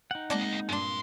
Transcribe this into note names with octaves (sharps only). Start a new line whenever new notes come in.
D#4 F#5 G5
C#2 G#3 A#3 C4 D5 D#5 A5 D6
G2 A#2 G#3 D4 C6